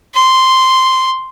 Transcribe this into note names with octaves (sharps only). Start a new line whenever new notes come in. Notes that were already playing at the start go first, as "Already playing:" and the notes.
C6